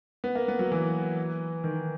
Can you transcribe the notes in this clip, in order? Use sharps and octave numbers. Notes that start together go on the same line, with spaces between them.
B3
A#3
B3
F#3
E3
D#3